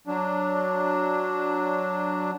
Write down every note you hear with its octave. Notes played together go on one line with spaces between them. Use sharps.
F#3 D4